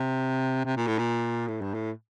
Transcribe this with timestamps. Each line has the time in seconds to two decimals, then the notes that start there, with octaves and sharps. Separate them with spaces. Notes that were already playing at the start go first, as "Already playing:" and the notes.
Already playing: C3
0.65 C3
0.76 A#2
0.87 A2
0.99 A#2
1.48 A2
1.61 G2
1.74 A2